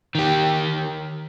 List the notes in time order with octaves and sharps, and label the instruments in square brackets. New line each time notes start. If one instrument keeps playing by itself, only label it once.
[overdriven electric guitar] D#3 G4